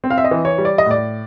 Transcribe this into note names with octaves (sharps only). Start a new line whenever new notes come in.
C4
F5
E5
D#5
E3
C#5
G3
D5
D#5
A2 D5